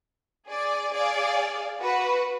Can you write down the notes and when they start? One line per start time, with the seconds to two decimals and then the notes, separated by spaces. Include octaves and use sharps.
0.47 G#4 D5
0.92 G#4 D5 F5
1.80 F#4 B4